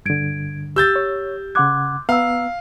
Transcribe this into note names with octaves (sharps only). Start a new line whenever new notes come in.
G2 D3 G#6 D7
G4 E6 G6 A6
C#5
C#3 F#5 C6 D6 F#6 G#6
B3 F5 A#5 E6